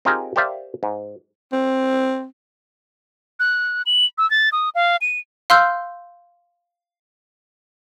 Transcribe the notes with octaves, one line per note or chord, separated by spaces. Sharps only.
C4 D#4 F4 G4 G#4 A#4
G4 A#4 C5 D5 E5 F5
G#2
C4
F#6
F#7
E6
A6
D#6
F5
D#7
F5 C6 E6 F6 G6